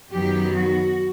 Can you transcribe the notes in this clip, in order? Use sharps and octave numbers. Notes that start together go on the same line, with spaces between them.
F#2 D#3 F#3 B3 G4
F#4